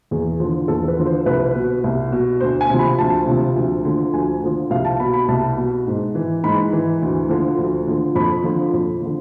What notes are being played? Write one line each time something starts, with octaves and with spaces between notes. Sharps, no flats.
E2 G#4
D3 F3
E2 A4
B4
D3 F3
C5
C2 B4
B2
C2
B2
D2 C5
G#5
C3 F3
B5
D2 A5
C3 F3
D2
D3 F3
D2 G#5
D3 F3
C2 F5
A5
B2 B5
B5
C2 A5
B2
G#2
E3
G#2 B5
E3
D2
D3 F3
D2
D3 F3
F2 B5
D3 F3
F2
D3 F3